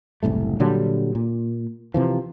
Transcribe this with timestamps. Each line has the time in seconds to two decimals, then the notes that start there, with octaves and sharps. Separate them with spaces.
0.23 F#1 C2 A2 A3
0.60 A#2 D3 F#3 G3
1.15 A#2
1.94 C3 E3 F3